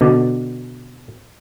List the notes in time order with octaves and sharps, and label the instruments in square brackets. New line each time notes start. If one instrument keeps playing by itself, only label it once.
[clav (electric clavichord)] B2 D3 D5